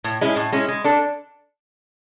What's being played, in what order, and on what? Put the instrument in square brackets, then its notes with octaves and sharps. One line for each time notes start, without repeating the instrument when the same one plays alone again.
[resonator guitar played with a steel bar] A2
G#3 C#4 E4
A2
G#3 C#4 E4
G#3
D4 A4